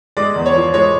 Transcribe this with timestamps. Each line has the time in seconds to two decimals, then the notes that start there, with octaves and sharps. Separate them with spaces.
0.17 G#3 D5
0.36 E2
0.46 C#5
0.55 F3
0.74 G#3 C#5